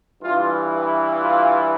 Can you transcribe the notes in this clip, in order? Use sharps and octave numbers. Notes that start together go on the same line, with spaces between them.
G2 E3 F4
F4